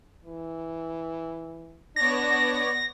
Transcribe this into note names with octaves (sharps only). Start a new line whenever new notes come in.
E3
B3 D4 C#5 D5 A#6